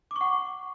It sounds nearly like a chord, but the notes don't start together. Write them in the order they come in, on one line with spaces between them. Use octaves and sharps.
D6 C#6 F#5